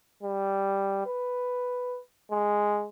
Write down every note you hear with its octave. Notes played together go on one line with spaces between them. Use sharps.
G3
B4
G#3